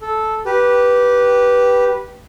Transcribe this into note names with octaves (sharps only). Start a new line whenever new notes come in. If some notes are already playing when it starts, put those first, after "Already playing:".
A4
G4 B4